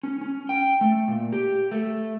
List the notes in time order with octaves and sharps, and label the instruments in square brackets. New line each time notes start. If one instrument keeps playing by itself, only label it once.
[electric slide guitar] C#4
C#4
G5
A3
A#2
G4
A3